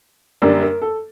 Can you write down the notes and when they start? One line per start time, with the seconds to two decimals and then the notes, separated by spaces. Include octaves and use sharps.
0.42 F#2 D3 G3 A#3 D4 A#4
0.62 A#4
0.82 A4